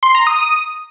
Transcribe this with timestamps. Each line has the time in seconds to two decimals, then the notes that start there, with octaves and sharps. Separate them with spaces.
0.03 C6
0.15 A#5
0.27 D#6
0.39 D#6